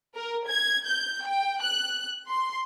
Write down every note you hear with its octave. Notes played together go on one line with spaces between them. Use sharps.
A#4
G#6
G6
G5
F#6
C6